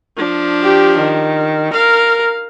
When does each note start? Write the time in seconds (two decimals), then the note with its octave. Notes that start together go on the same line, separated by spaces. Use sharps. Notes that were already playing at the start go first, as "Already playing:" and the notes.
0.17 F3 D4
0.62 G4
0.98 D#3
1.73 A#4 F5